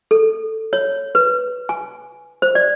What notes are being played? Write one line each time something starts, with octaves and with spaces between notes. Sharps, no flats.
A4
C#5
B4
G#5
C5
D5